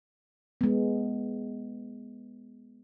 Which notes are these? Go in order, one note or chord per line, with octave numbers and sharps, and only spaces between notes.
G#3 B3